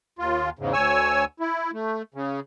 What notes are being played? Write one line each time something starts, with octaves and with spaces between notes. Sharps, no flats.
D#2 F4
E2 G#2 C#3
D2 C#5 G#5 E6
E4
A3
C#3